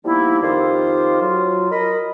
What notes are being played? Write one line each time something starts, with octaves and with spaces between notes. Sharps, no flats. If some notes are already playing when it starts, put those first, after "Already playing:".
F3 G3 A#3 B3 D#4 E4
F2 D#3 F4 G4 C5 F5
F#3 F4
A#4 D#5 B5